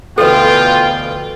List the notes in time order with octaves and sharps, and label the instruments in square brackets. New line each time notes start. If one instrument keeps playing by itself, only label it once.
[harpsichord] D2 E3 [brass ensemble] B2 G5 [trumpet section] F4 [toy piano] A4 B4